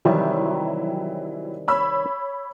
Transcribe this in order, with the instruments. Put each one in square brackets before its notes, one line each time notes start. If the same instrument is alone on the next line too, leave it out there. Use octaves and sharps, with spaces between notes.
[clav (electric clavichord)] C3 D#3 G3 [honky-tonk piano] E3 F#3 E4
[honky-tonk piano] C#5 B5 E6